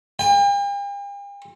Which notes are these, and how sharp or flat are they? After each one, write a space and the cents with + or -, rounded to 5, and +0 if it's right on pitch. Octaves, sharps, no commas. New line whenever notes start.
G5 +45